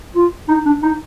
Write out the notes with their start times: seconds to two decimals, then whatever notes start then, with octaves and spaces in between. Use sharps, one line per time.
0.15 F4
0.48 D#4
0.65 D4
0.82 D#4